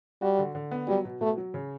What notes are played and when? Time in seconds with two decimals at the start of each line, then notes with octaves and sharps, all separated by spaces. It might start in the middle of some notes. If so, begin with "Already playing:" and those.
0.22 G3 F#4
0.38 D3
0.55 D3
0.71 B3
0.87 F#3 G3
1.05 B2
1.21 B2 A3
1.38 F#3
1.54 C#3